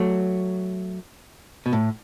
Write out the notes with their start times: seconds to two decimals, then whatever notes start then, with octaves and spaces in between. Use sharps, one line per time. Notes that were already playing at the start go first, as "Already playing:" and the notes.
Already playing: F#3 A3
1.66 B2
1.73 A2